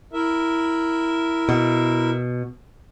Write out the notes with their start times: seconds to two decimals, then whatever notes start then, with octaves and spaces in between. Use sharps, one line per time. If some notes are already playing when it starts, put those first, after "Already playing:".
0.13 E4 A#4 E5
1.49 B2